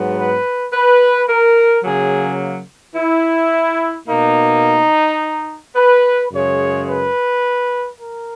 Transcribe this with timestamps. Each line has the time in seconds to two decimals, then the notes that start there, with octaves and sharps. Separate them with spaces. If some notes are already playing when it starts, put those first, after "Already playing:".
Already playing: G#2 F#3 B3
0.16 B4
0.73 B4
1.29 A#4
1.83 C#3 F#3 A#3 G#4
2.95 E4
4.08 B2 A#3 D#4
5.75 B4
6.31 F#2 C#3 G#3 C#5
6.88 B4
7.98 A#4